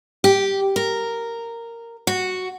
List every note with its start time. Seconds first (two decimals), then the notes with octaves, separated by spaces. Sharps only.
0.24 G4
0.76 A#4
2.07 F#4